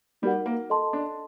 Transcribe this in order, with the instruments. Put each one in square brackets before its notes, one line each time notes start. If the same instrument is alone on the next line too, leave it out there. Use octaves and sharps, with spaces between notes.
[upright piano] G3 [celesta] D#4 F#4 A#4 F#5
[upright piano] A#3
[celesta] A4 D#5 A5 C6
[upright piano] D4